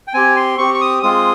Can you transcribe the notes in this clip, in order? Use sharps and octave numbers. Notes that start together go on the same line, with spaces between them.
G5
C4 G4 G#5
C6
C4 G4 C#6
C#6
D#6
G#3 C4 F4 D#6